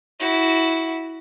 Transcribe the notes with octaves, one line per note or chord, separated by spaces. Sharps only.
E4 F#4